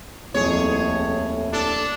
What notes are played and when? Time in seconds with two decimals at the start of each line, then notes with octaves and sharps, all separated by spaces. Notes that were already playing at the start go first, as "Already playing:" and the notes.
0.34 D#1 F2 A2 G#4 C#5
1.53 D4 A4